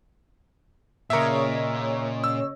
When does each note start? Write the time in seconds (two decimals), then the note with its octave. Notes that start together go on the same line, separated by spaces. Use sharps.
1.10 A#2 C#3 A#4 C#5 D#5 E5
2.24 E6